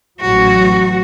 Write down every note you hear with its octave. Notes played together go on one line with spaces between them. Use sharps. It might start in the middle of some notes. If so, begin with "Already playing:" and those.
A1 F#3 F#4